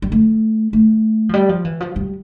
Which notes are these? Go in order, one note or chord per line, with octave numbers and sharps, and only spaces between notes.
G3
A3
A3
F3
G3
F3
E3
F3
G3